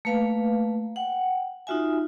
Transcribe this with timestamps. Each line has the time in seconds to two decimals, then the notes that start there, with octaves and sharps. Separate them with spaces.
0.05 A3 A#3 B4 F5
0.96 F#5 G5
1.67 D#4 F4 F#4 E5 G#5